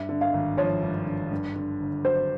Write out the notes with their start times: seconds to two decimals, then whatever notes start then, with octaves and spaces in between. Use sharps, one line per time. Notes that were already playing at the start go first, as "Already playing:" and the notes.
Already playing: G2 E5
0.09 D3
0.21 F5
0.34 G#1
0.57 F3 C#5
0.83 G2
1.07 D3
1.31 G2
1.56 D3
1.80 G1
2.05 F#3 C5